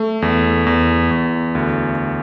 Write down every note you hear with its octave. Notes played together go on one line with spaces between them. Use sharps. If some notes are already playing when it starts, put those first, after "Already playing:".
Already playing: A3
E2
E2
E2
D2